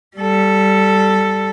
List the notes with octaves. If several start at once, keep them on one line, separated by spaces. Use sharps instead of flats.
G3 A4